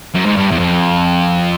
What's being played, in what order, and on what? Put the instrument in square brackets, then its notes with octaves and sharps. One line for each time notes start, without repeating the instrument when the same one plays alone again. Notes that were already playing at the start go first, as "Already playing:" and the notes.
[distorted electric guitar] F#2
G#2
G2
E2
F2